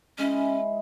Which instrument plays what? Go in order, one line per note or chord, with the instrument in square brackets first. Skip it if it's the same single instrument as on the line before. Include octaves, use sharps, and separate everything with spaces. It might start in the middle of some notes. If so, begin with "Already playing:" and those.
[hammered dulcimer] G#3 E4 [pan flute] C#4